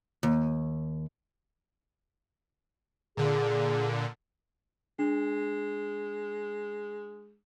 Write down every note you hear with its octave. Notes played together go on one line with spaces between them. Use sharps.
D#2
A#2 D3 G#4
G#3 D4